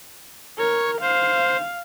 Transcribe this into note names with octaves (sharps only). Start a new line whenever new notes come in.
A#4 C#5
C5 F5